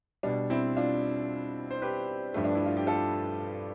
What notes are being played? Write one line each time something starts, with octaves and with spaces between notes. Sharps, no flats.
B2 G3 D4
C4 E4
D4 F4
C5
G4 B4
G2 F3 A3
D4
E4
F4
G4
F4 A4